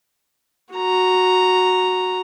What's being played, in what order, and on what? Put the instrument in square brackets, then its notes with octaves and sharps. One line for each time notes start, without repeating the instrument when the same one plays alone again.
[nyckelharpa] F#4 A#5